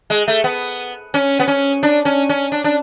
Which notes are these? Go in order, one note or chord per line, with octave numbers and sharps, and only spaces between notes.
G#3
A3
B3
C#4
B3
C#4
D4
C#4
C#4
D4
D4